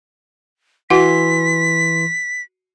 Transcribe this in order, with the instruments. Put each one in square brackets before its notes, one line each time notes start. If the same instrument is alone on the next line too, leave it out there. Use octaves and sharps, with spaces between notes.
[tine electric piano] E3 C6 [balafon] F#4 F#5 [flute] B6